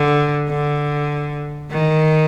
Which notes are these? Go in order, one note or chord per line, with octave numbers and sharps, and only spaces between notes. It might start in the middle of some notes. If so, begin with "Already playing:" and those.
Already playing: D3
D3
D#3